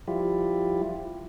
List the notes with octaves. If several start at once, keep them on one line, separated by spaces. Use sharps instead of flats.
F3 G3 E4 F4 G4